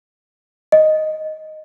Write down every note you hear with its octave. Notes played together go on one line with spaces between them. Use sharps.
D#5